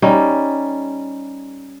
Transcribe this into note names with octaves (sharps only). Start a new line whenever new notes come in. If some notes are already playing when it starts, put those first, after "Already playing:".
G3 C#4 D#4